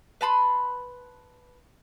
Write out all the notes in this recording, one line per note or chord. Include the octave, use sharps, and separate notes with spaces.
B4 A5 B5 C6